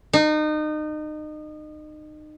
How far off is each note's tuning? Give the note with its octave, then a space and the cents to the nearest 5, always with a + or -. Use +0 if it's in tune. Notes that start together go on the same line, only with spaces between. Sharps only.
D#4 -30